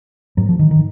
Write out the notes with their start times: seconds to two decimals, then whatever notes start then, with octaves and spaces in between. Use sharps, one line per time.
0.37 G#2 F#3
0.49 F3
0.59 D#3
0.71 D#3